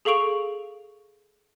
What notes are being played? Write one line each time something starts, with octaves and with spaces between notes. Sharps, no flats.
G#4 A4 F5 C#6 D7 F7